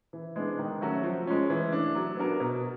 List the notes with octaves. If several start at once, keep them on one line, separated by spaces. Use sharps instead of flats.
E3
G#3 B3 D4
D#3
F#3 A3 C#4 F#4
F3
G#3 C#4
E3
A3 D4
F#3
B3 D4 F#4 A#4
B2